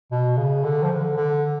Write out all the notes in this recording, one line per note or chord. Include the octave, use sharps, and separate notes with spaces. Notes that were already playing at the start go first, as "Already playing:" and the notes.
B2
C#3
D3
F3
D3
D3